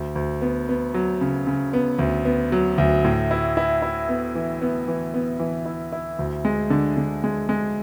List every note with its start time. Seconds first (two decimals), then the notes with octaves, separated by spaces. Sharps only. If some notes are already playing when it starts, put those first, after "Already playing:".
Already playing: D2
0.15 D2
0.41 B3
0.69 B3
0.94 F#3
1.21 C#3
1.47 C#3
1.73 B3
1.99 D2
2.25 B3
2.52 F#3
2.78 D2
3.04 A2
3.31 E4
3.57 E4
3.82 E4
4.09 B3
4.35 E3
4.62 B3
4.88 E3
5.14 B3
5.39 E3
5.66 E4
5.92 E4
6.19 D2
6.45 G#3
6.70 D3
6.97 D3
7.24 G#3
7.49 G#3